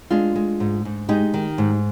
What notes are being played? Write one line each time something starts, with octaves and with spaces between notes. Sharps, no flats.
G#3 D4 F4
G#3
G#2
G#2
G#3 D#4 G4
D#3
G#2